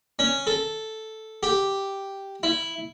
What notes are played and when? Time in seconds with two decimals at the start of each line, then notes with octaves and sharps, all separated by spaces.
0.19 C#4
0.47 A4
1.43 G4
2.43 E4